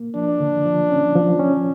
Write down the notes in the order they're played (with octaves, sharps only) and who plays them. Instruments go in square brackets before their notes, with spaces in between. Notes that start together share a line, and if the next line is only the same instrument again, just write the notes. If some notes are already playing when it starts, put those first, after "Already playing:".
Already playing: [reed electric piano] A#3
[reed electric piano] F3 [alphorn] D4
[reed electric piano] D3
F3
C#4
F3
C#4